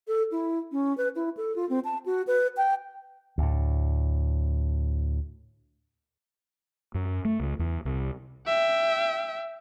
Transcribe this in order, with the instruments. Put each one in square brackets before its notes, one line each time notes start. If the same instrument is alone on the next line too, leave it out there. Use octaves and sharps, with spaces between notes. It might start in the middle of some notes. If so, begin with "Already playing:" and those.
[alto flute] A4
E4
C#4
B4
E4
A4
F4
C4
A5
F#4
B4
G5
[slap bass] D2 A2
[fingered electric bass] F#2
A3
C#2
E2
C2
[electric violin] E5 G5